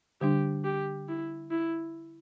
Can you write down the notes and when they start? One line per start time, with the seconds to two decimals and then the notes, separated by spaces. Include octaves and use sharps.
0.21 D3 G3 D4 G4
0.64 G4
1.09 E4
1.51 E4